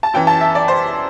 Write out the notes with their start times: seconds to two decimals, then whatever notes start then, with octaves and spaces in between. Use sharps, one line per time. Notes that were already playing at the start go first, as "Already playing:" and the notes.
0.03 A5
0.14 F#2 E3 G5
0.27 A5
0.41 E5
0.55 D5
0.68 C5